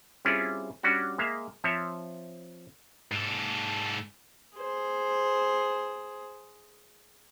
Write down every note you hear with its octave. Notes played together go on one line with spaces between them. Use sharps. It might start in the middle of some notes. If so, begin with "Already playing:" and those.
G3 C4 C#4 E4 F4 G#4
G3 C#4 D4 F#4
G#3 A#3 E5 F5
F3 C4 C5 C#5 E5
G#2 A4
G#4 C5